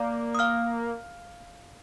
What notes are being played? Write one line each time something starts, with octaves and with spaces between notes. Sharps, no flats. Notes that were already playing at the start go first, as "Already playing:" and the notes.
Already playing: A#3 D5 D6
D#6
F5 F6